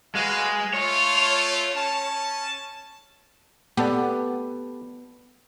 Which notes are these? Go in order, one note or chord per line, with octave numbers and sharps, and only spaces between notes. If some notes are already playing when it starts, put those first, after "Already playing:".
G#3 F#4 B4 F5
A3 F4 C#5
C#4 A5
B3 G4 A4 D5